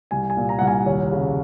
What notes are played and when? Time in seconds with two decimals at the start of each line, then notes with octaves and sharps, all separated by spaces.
0.11 C2 G#5
0.30 G#5
0.37 A#2
0.49 A#5
0.59 C2 F#5
0.67 G#5
0.86 D#2 C#5
1.12 C#3